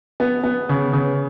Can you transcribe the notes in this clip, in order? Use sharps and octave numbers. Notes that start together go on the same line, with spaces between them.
B3
B3
C#3
C#3